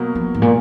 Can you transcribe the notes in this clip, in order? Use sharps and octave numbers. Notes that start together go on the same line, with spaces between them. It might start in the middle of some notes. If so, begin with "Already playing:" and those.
Already playing: B2 F#3 A#3
F3
G#2
A#2